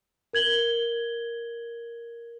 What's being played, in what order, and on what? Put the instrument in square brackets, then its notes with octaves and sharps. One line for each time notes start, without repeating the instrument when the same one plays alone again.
[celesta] A#4 G#6 F#7 G7